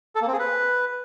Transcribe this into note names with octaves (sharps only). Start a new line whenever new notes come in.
A4
A#3
C4
G#4
B4